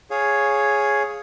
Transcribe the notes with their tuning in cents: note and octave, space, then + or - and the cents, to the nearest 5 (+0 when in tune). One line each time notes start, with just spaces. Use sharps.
G#4 +5 C#5 +0 F5 +5